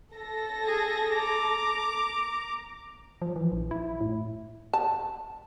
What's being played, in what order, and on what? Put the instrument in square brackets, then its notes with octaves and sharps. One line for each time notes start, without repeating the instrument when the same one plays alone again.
[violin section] A4 A#6
[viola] G#4
A#5 D6
[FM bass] F3
E3
A#1
E4
A2
[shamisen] A5